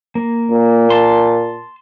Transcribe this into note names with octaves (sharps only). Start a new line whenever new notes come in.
A#3
A#2
A5 C6